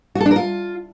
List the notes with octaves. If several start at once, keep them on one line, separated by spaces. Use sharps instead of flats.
F#4
A4
D4
A#4
F4